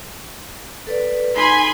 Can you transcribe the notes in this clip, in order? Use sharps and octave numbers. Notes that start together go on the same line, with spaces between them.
A4 B4 D5
D#4 G#5 B5 C6